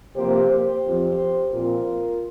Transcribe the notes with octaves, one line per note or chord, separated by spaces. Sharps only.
C3 F3 A#3 G4 C5
G4 C5
F2 F3 C4
A#2 F3 C4 F4 A#4